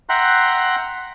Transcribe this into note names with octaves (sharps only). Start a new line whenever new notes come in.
E5 F#5 G5 A#5 C6 F#6